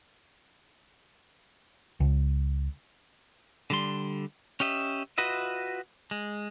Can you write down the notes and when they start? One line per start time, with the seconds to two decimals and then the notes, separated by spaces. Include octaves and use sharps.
2.00 C#2
3.70 D3 G3 C6
4.60 C#4 G4 D#5 E5
5.18 F4 F#4 B4 D#5 E5
6.11 G#3